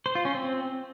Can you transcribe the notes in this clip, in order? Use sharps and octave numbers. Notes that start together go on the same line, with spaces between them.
C5
F4
C#4
C4